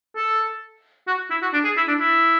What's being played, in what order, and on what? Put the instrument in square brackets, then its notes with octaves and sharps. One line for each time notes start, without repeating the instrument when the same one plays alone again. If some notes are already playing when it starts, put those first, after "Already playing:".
[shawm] A4
F#4
E4
F#4
D4
G#4
E4
D4
E4